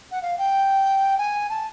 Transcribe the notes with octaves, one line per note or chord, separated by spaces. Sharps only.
F#5
F5
G5
G#5
A5